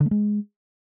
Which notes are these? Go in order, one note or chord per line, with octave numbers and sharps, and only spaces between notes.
D3
A3
G#3